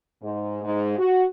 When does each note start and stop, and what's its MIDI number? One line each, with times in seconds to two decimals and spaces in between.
0.22 0.64 44
0.64 0.97 44
0.98 1.25 66